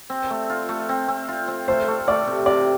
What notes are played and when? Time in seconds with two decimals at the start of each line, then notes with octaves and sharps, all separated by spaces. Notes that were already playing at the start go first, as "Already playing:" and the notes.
0.10 C4
0.30 A3
0.50 F4
0.69 A3
0.89 C4
1.08 C4
1.28 F4
1.48 C4
1.68 A3 C5
1.88 A3
2.07 A3 D5
2.27 C3
2.46 C3 D5